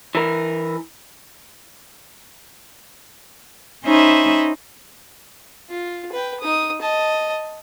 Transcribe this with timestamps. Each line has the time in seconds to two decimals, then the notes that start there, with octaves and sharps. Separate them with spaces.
0.15 E3 A#4
3.84 C#4 D#4 C5 E5 B5
5.69 F4
6.12 B4 G5
6.40 D#4 D#6
6.81 D#5 A5